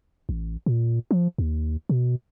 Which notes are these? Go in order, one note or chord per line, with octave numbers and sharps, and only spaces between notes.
A1
A#2
F3
D#2
B2